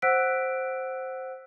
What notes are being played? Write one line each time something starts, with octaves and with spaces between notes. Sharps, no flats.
C5 F#5 E6 F#6 B6 D7